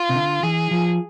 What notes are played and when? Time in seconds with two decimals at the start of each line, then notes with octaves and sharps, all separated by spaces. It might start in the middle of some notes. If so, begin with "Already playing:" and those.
Already playing: F4
0.09 C3
0.15 D3
0.43 E3 G#4
0.71 F3